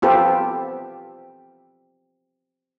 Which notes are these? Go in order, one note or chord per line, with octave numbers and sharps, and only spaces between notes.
B3 C4 F4 G4 A4